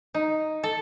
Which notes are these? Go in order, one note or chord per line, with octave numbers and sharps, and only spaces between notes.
D#4
A4